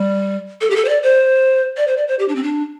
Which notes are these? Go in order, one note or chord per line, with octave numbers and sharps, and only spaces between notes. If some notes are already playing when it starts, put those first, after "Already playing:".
Already playing: G3
A4
G4
A4
C5
D5
C5
D5
C5
D5
C5
G4
D4
C4
D4